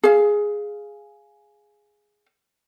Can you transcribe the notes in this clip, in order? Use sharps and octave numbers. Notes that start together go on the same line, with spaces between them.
G#4 F5